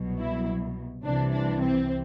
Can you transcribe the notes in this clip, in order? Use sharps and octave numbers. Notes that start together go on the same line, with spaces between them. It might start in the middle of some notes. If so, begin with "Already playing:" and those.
Already playing: C2 B2 F#3
E4
C2 C3 E3 D4
D4
C4